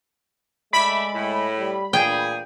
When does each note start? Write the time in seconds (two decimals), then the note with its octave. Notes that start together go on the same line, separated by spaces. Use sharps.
0.73 G#3 A3 D5 E5 B5
1.15 A2
1.59 G3
1.93 A#2 G#4 G5